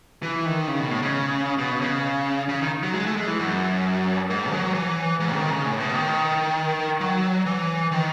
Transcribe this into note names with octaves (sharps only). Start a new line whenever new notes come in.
E3
D#3
C#3
B2
A2
C#3
B2
C#3
C#3
D#3
F#3
G#3
A3
G#3
E3
F#2
G#2
F#3
E3
G#2
D#3
C#3
A2
B2
D#3
F#3
E3
D#3